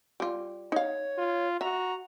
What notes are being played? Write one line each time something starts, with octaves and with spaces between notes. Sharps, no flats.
G3 F4
D#4 C#5 F5
F4
F#4 E5 A#5